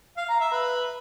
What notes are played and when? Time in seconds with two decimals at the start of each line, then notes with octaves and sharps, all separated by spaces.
0.17 F5
0.29 A#5
0.40 E5
0.52 B4